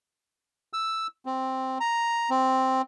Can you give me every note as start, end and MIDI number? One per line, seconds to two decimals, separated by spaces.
0.73 1.07 88
1.26 1.78 60
1.80 2.30 82
2.30 2.82 60